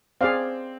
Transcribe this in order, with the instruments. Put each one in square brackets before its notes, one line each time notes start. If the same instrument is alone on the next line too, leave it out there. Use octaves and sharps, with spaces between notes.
[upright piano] C4 [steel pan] G#4 D5 F5